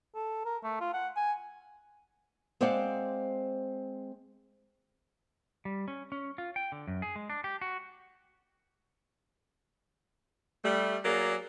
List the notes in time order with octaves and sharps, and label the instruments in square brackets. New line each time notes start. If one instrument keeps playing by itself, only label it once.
[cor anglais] A4
A#4
A3
F4
F#5
G#5
[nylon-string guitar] G#3 C4 C5 D5 F5 F#5
[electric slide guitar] G3
C#4
C#4
F4
G5
D3
F#2
G#4
G#3
D4
G4
F#4
[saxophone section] G3 A3
F#3 A#3 G#4 D5